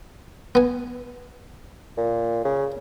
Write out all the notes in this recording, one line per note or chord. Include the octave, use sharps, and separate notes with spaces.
B3 G#5
A#2
C#3